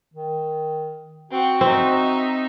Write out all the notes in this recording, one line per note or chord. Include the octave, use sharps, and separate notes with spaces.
D#3
C4 F#4 F#5
C4 D#4 E5